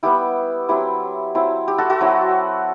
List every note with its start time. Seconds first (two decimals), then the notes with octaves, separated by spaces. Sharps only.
0.03 G3 B3 E4 G4
0.69 F#3 C4 E4 G4
1.35 F#3 C4 E4
1.68 G4
1.78 F#4 A4
1.90 F#4 A4
2.01 F#3 C4 E4